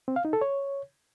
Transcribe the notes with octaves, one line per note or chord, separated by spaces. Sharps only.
C4
F5
D#4
A4
C#5